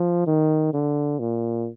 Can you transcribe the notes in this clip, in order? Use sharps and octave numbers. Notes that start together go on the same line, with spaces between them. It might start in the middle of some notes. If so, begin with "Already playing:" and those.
Already playing: F3
D#3
D3
A#2